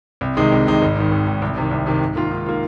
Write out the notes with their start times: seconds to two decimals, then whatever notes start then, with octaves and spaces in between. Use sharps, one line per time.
0.21 C2
0.37 C3 D#3 G#3 D#4
0.52 C2
0.67 C3 D#3 G#3 D#4
0.81 G#1
0.96 G#2 D#3
1.11 G#1
1.27 G#2 D#3
1.42 C2
1.57 C3 D#3
1.71 C2
1.86 C3 D#3
2.01 G#2
2.16 D#3 A#3 F4
2.31 G#2
2.46 D#3 A#3 F4